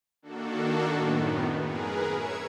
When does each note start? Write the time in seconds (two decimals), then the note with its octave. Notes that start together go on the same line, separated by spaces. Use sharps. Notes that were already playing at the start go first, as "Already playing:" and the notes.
0.22 D#3 A#3 D4 F#4 A4
0.89 F#2 A2 D#3 B3
1.56 G#4 A#4 B4
2.14 C#5 E5 E6 G#6 C#7